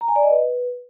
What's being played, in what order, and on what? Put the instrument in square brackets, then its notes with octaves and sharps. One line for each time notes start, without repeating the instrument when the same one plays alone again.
[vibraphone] A#5
G#5
D5
D#5
B4